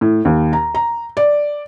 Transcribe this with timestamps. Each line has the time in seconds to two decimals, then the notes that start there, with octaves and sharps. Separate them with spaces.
0.01 A2
0.25 D#2
0.53 A#5
0.75 A#5
1.17 D5